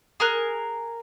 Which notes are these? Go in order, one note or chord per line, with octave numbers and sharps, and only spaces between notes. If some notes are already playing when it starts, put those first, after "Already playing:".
G#4 A#4 F#6